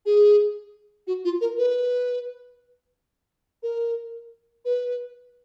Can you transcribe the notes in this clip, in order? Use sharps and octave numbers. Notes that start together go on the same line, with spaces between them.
G#4
F#4
F4
A#4
B4
A#4
B4